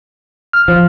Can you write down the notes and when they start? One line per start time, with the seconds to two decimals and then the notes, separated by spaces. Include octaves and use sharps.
0.53 F6
0.68 F3